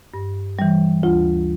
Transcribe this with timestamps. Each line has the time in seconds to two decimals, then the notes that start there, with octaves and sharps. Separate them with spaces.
0.14 G2
0.59 E3 G3
1.03 D2 F4